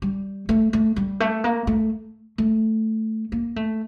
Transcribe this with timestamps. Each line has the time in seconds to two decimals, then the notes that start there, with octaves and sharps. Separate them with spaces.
0.02 G3
0.49 A3
0.73 A3
0.96 G3
1.20 A3
1.44 A#3
1.67 A3
2.38 A3
3.32 A#3
3.56 A3